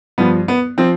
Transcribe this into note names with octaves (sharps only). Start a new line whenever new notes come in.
G2 F3 B3
B3
F3 C4